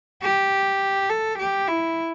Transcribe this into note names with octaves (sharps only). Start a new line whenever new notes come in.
G4
A4
G4
E4